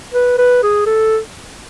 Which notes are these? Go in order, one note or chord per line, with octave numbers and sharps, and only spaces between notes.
B4
B4
G#4
A4